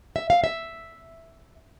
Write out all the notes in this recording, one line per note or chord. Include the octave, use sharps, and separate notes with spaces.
E5
F5
E5